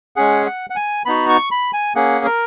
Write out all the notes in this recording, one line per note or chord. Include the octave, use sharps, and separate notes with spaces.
G#3 C#4 G#4 F#5
F#5
F#5
G#5
B3 D#4 F#4 B5
C#6
B5
G#5
A#3 C#4 G#4 F#5
A#4